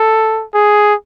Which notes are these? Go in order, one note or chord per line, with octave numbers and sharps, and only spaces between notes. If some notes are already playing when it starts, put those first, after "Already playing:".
Already playing: A4
G#4